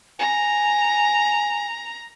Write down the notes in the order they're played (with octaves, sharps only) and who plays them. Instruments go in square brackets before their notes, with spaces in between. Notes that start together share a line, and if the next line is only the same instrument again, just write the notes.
[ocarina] G#5 [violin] A#5